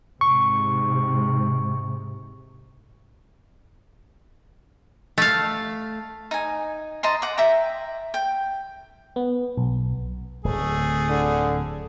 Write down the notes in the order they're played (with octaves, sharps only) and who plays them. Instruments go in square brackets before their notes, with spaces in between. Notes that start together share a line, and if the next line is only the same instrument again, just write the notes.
[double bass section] G#2 C3 [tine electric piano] C#6
[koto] A3 F5
[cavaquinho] D#4 G#5
D#5 A5 A#5 C6
F#5 D6
E5 G5 A#5 D6
G5
[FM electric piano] B3
B1
[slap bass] D1 [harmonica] A3 G#4
[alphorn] D3